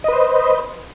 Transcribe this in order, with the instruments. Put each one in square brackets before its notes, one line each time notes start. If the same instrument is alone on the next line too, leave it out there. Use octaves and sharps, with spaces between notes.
[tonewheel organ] D#5
B4
C5